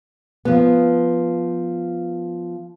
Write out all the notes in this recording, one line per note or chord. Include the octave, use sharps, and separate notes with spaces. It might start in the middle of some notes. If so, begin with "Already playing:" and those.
F3 B3